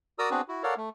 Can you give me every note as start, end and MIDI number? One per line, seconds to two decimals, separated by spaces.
0.19 0.30 66
0.19 0.30 70
0.19 0.30 74
0.19 0.30 82
0.19 0.30 87
0.19 0.30 88
0.31 0.41 59
0.31 0.41 60
0.31 0.41 62
0.31 0.41 66
0.31 0.41 68
0.31 0.41 71
0.48 0.63 64
0.48 0.63 66
0.63 0.74 69
0.63 0.74 70
0.63 0.74 73
0.63 0.74 74
0.63 0.74 77
0.63 0.74 78
0.77 0.89 57